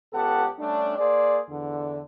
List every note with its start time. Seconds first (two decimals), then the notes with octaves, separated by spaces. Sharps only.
0.13 C#2 B3 G4 A4 F#5 A5
0.59 G3 A3 C#4 D4
0.98 A#3 G#4 C5 D5
1.49 E2 D3